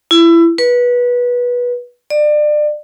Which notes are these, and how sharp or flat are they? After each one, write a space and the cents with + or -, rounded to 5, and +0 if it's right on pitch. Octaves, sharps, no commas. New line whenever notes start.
E4 +25
B4 -20
D5 +30